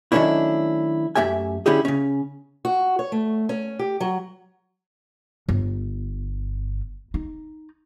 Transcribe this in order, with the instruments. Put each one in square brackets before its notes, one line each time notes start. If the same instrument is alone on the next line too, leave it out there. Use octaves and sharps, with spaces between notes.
[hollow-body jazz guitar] D#3 F#3 A3 C#4 D4 E4
F#2 A3 G4 E5 G#5
D3 C#4 E4 G4 G#4
C#3 C#4
[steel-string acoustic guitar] F#4
C#5
A3
C#4
G4
F#3
[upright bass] G1
D#4